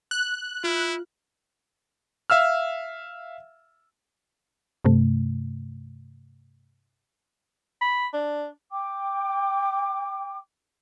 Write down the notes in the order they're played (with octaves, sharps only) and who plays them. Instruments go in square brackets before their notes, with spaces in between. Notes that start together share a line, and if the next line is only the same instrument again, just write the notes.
[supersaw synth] F#6
[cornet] E4 [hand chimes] F4 F6
[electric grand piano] E5 F5 E6 F6
[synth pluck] G2 C3 A3
[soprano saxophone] B5
D4
[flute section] G5 D6